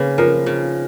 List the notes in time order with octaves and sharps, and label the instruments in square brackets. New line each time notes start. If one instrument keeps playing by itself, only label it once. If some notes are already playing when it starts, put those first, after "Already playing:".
Already playing: [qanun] C#3 A#3 [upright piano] B4
[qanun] F3 [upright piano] A#4
[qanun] C#3